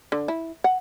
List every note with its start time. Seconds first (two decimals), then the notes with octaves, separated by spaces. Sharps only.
0.12 D3
0.28 E4
0.64 F#5